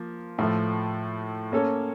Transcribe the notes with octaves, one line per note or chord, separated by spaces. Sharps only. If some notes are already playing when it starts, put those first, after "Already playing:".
Already playing: F3 A#3
A2 F3 A3
A#3 C#4 A4 C#5